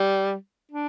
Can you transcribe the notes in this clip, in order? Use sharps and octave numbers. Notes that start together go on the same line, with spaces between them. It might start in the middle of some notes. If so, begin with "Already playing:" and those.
Already playing: G3
D4